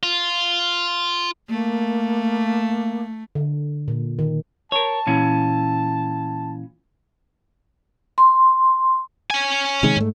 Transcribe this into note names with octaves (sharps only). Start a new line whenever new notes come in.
F4
A3 A#3
D3
A#2
D#3
A#4 C#5 A5
A#2 E3 C#4
C6
C#5 G#5
C3 D#3 G#3
G#2 A3